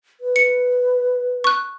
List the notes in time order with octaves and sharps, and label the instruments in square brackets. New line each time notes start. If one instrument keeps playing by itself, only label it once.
[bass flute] B4
[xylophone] C#7
C#6 F#6